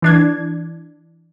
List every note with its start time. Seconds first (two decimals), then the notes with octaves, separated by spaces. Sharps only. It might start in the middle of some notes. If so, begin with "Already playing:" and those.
0.02 E3 D4 G#6